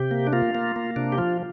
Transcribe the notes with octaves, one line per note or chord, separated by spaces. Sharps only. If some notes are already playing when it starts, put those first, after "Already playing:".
Already playing: C3 G4
A#3
D4
A#3 F4
A#3
A#3
C3 D4
G4
F3 F4